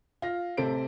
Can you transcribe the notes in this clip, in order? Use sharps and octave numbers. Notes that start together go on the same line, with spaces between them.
F4 A#6
A1 C3 A4 C5 D7